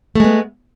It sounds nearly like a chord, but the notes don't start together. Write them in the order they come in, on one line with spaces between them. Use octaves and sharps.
A3 G#3 B3